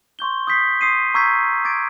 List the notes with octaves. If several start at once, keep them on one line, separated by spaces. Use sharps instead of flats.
C6 C#6 G6 G7
D#6 G6 B6 C7
C6 D#6 C7 D#7
A#5 C#6 E6 G6 G#6 B6
D6 G#6 A6 D7